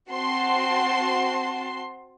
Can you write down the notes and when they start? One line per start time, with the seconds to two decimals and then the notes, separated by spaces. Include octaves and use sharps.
0.11 C4 F#4 A5 C6